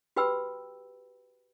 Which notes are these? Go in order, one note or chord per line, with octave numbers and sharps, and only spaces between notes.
F#4 G4 B4 G5 B5 E6